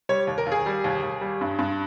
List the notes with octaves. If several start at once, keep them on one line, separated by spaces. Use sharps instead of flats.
G3 C#5
D#2
A#4
D#2
G#4
G3
D#2
D#2
G3
G2
G2